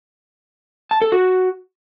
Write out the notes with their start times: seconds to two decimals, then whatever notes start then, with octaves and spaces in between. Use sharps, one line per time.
0.91 A5
1.02 A4
1.12 F#4